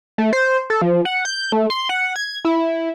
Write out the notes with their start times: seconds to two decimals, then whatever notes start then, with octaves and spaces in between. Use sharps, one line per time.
0.18 A3
0.33 C5
0.70 A4
0.82 F3
1.05 F#5
1.25 G6
1.52 A3
1.70 C6
1.89 F#5
2.16 G#6
2.45 E4